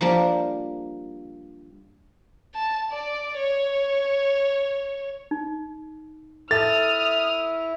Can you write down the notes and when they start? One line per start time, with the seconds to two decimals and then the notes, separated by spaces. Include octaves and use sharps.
0.01 F3 G3 A#3 D4
2.54 A5
2.91 D5
3.37 C#5
5.31 D#4
6.51 E4 A4 E5 A5 D#6 F6 A6